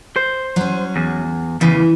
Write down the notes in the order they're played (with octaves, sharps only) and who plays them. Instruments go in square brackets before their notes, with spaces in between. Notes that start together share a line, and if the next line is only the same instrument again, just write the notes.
[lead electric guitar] C5
[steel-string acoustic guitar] F#3 C#4
[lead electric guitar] E2
[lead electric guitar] E2 C#3 [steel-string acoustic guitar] E3